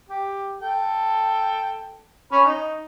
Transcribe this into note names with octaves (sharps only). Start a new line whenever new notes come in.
G4
A4 G5
C#4 C#5 B5
D#4